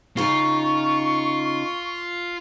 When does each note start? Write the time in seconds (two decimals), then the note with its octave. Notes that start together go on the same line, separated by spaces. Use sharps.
0.17 C#3 D#4 F4 C#6